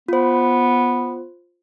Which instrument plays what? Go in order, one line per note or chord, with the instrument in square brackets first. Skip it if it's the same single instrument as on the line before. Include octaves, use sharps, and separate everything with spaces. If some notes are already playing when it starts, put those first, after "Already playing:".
[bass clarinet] B3 [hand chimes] F4 C5